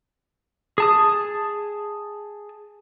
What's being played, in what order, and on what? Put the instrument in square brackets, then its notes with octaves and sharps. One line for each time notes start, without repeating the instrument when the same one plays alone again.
[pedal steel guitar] G#4 A5 D#6